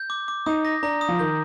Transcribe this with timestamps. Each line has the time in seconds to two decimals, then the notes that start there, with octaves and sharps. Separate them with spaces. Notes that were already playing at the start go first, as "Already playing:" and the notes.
Already playing: G6
0.10 D6
0.28 D6
0.46 D#4 D#6
0.65 A#6
0.83 D4 A#5
1.01 D#6
1.09 F3
1.19 D#3 G6